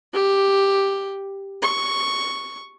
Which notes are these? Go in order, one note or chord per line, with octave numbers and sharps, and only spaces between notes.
G4
C#6